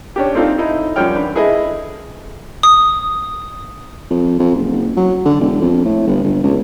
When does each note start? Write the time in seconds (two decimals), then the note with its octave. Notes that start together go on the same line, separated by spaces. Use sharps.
0.16 C#4 D4 G4
0.34 A3 C4 D4 D#4 F4 A4
0.58 D#4 E4 A4 D#5 E5
0.96 F#2 F3 G3 C#5 G5 F6
1.16 D3 B4
1.35 E4 G#4 A4 B4 D#5 E5
2.63 D#6
4.10 F2
4.39 F2
4.55 F#1
4.71 F#1
4.97 F#3
5.25 D3
5.40 E1
5.61 F2
5.85 A2
6.07 G1
6.24 G1
6.43 C#2